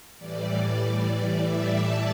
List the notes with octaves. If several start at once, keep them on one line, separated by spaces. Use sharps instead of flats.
A2 E3 G3 D5
E5
A5